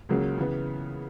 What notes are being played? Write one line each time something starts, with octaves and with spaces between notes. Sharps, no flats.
C#2 C#3 F#3 A#3
C#3 E3 B3